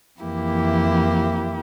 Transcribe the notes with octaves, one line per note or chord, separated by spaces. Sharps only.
F2 E3 A#3 E4 G4